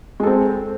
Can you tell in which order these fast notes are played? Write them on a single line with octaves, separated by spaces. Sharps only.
G#3 A4 C4